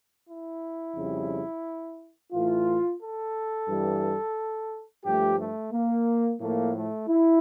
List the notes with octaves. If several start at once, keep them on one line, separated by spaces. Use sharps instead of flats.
E4
F2 C#3 G3
A2 E3 A3 F4
A4
G2 E3 G3
G2 F3 A3 G4
A3
A#3
A2 F3 A3 A#3
A3
E4